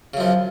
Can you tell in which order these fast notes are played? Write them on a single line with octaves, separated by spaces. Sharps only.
C#3 F#2 F3